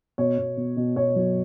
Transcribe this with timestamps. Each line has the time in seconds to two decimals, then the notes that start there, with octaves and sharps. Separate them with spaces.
0.18 B2 C#5
0.38 B2
0.57 B2
0.77 B2
0.96 B2 C#5
1.16 F#3